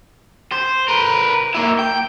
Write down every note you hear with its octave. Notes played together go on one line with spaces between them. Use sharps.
C5
A#4 B4
A#3 E4
G5